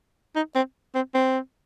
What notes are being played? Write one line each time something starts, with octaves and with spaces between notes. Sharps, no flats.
D#4
C4
C4
C4